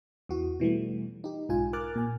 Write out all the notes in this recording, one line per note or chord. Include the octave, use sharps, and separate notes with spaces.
E2 E3 F#4
B2 E3 G3 A3
D#4 G4
B1 G#2 F4 G#5
A#4 G#5 D6 F6 F#6 A6
A#2 G#5